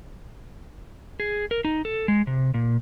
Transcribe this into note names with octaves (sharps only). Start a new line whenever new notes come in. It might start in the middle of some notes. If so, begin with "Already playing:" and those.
G#4
A#4
D#4
A4
G#3
C3
A#2